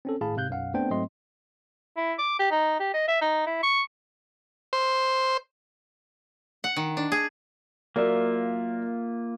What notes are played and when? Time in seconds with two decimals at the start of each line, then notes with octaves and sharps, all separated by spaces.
0.05 C4 C#4 A4
0.21 G#1 A2 G#4 F5 A5 B5
0.36 G#2 C3 F5 F#6 G6
0.50 B1 F#2 F5 F#5
0.74 A3 B3 C4 D4 C5 G5
0.90 G#2 F#3 A3 C4 D#5 C6
1.97 E4
2.19 D6
2.39 G4
2.51 D#4
2.79 G4
2.94 D#5
3.08 E5
3.21 D#4
3.46 E4
3.63 C#6
4.73 C5
6.64 F#5
6.76 D#3
6.97 D4
7.12 G#4
7.96 F#3 A#3 F4 A#4 D5 E5